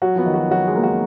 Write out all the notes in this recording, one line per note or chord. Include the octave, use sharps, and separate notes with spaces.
F#3 F#4
F3 B3
D#3
F#4
F#3 F#4
G#3
A#3
F#4